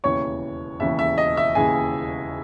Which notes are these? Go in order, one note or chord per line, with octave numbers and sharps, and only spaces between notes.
E1 D#2 C#3 E3 C#5 C#6
E1 D#2 C#3 E3 E5
E5
D#5
E5
E1 D#2 C#3 E3 G#4 G#5